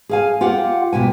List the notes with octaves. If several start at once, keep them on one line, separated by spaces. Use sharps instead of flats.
G#4 F5 G#5
F4 G4 F5 F#5
D2 B2 G4 G#5